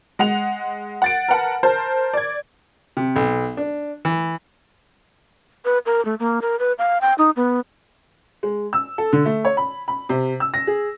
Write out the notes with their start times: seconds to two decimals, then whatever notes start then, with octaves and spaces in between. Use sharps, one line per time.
0.19 G#3 F#5 F7
1.02 F#5 A6 D7
1.28 A#4 B4 F#5 A5
1.63 A#4 C5 A5
2.13 D5 G#6
2.97 C3
3.16 B1
3.57 D4
4.05 E3
5.65 B4
5.86 A#4
6.05 A3
6.20 A#3
6.42 A#4
6.59 B4
6.79 F5
7.01 G5
7.18 D#4
7.36 B3
8.43 G#3
8.73 E6
8.98 A4
9.13 D3
9.26 A3
9.45 C#5
9.57 B5
9.88 B5
10.09 C3
10.40 E6
10.54 A#6
10.67 G#4